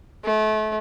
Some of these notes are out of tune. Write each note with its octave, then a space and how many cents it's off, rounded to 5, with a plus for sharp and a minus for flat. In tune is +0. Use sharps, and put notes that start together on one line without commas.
A3 -35